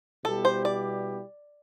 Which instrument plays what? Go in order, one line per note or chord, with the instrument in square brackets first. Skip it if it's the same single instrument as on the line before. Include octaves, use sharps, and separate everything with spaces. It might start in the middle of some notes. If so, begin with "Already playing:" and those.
[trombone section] B2 G3 B3 E4 G4 [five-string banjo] A4
[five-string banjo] C5
D5